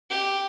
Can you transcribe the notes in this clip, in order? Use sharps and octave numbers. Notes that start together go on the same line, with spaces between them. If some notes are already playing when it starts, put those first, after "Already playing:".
G4